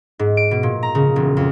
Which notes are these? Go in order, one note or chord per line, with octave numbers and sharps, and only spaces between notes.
G#2
D7
B2
A#2
A#5
C#3
E1
F2